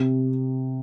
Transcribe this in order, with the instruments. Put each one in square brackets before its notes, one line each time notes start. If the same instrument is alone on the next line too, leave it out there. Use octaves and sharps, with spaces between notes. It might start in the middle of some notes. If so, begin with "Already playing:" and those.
Already playing: [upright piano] C3